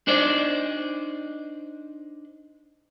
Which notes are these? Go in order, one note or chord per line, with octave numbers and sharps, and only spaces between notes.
D4 D#4 C5 D5